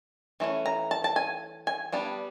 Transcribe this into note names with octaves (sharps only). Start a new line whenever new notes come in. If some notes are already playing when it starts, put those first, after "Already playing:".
E3 A3 C#4
A#5
A5
A5
G#5
G#5
G3 B3 D4